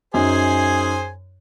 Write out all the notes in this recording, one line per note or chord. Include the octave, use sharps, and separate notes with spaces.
F#2 D#4 G#4 C5 G#5